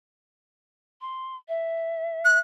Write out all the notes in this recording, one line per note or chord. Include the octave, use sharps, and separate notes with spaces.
C6
E5
F#6